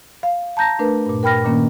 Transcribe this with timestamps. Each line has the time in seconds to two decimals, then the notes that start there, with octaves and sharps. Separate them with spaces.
0.23 F5
0.57 A5 A#5 G6 A#6
0.79 A3 D4 A#4 B4
1.06 G2 A#2
1.23 A#4 G5 B5 F6 A#6
1.44 A#2 D#3 A#3 C#4